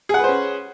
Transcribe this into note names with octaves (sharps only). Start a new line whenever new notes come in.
C#4 G#4 B4 C5 F#5